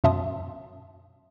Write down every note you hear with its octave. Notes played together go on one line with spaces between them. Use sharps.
F#2 B2 E5 A5 C6 D#6